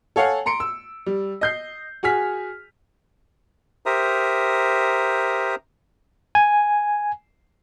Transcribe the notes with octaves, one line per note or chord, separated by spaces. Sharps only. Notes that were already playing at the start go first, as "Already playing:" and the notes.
A4 C#5 F5 F#5 G#5
A#5 C6 C#7 D7
E6
G3
D#5 G6 C7
F#4 G#4 G#5 F6 B6
G4 A#4 C5 E5 A#5 D#6
G#5